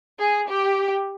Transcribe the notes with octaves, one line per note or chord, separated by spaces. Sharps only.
G#4
G4